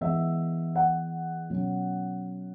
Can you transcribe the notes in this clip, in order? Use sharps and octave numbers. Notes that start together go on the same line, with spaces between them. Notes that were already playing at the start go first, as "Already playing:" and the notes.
E3 G#3 B3 E5
F#5
B2 F#3 C#4